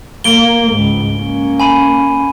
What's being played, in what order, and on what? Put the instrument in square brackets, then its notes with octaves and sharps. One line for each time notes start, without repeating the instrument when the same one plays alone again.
[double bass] A#3 [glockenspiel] D7 G7
[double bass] C#2 G#2
A#3 C#4
[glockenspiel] G#5 B5 D#7